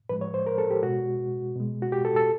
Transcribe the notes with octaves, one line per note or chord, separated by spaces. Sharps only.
A2 F3 G#3 B4
C#5
C5
A#4
A4
G4
B2 G#3 F#4
B2 G#3
F#4
G4
A4
A4